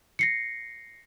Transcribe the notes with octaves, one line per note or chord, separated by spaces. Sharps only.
A#6 C7 C#7